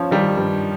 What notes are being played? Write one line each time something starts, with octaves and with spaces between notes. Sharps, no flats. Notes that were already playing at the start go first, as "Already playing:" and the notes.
Already playing: F3 C#4
D#3 G3
G2